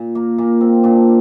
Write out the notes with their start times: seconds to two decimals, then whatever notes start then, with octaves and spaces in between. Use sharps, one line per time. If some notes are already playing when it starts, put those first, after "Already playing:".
Already playing: A#2
0.15 A#3
0.38 A#2 A#3
0.61 C4
0.83 A#2 D4